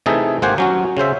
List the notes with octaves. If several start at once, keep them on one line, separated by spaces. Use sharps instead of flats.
C3 E3 A3 D#4 G#4 A4
G#1 A#3 G4 C5 F#5 G#5
F#3 C#4 F#4
C#3 C#4 C5 E5